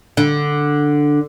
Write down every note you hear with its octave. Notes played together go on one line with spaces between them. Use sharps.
D3